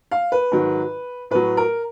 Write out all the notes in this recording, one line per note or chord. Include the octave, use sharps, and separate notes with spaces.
F5
B4
G#2 D#3 F#3
A2 F#3 B4
A#4